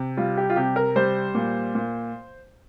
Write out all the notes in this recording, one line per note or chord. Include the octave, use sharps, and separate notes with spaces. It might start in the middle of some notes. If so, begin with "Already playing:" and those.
Already playing: C3
G3 F4
G4
F4
C3 G4
A#4
G3 C5
A#2
A#2